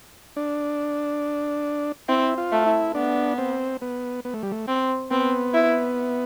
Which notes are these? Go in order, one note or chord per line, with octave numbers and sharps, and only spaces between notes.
D4
C4 E4
F4
A3
E4
B3 D4
C4
B3
B3
A3
G3
A3
C4
B3 C4
E4